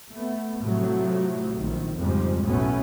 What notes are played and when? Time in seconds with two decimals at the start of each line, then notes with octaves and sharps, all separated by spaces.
0.12 A3 B3
0.60 A2 C3 F3 F#3 A3
1.55 A#1 D#3
1.98 F2 G#2 C#3 F3 G3 G#3
2.44 B1 A2 F#3 A3 B3 C#4